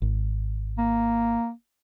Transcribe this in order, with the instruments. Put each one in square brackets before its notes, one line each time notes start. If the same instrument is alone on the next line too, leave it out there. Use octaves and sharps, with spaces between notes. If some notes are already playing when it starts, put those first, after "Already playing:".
[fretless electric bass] G#1
[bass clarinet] A#3